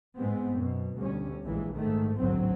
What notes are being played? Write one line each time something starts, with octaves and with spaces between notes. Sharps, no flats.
G#2 G#3 B3 C4
F#2 B2
D2 G3 C#4
A#1 A#2 E3 G#3
G#2 D#3 A3
A1 D2 G#2 F#3 C4